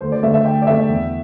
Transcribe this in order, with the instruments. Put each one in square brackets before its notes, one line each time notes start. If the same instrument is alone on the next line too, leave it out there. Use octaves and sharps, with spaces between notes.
[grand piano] D2 C5
D5
A3 E5
D3
E5
D2 G5
D5
D3 A3 E5
E2